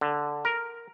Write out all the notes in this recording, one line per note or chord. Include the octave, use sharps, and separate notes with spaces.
D3
A#4